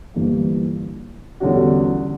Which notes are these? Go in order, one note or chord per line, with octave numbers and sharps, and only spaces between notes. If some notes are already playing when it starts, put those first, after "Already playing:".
G1 G2 E3 A#3
E2 D3 G3 C#4 F#4